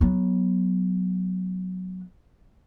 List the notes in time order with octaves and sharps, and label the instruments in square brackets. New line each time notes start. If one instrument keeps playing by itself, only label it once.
[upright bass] F#3 B3